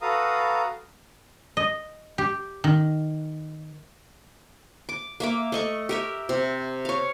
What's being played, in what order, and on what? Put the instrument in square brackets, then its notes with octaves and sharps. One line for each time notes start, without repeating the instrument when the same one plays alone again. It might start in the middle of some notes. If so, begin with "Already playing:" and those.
[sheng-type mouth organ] F#4 A4 B4 F5 A#5 D#6
[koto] D#5
G4
D#3
[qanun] D6
A#3 E5 D6
A3 D#5 C#6
G4 A#4 E5
C3
C#5 F5